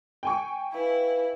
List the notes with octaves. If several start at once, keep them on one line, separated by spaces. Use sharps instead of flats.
G5 G#5 C#6
E4 B4 F5